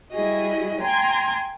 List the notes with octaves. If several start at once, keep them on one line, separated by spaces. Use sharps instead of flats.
G3 E4 F#4 G#4 D#5
G5 G#5 A#5 C6 G#6